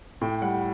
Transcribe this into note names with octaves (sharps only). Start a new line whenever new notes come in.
A2 G5
G3 F#5